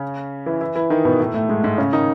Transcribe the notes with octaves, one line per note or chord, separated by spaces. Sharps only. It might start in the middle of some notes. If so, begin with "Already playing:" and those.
Already playing: C#3 C#4
E3 E4
E3 E4
E3 E4
D#3 D#4
B2 B3
A2 A3
A2 A3
G#2 G#3
G#2 G#3
C#3 C#4
D#3 D#4